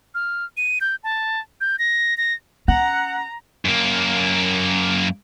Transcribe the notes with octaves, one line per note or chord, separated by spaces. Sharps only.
F6
D#7
G6
A5
G6
A#6
A#6
C#4 F#5 A#5
F#2 A#3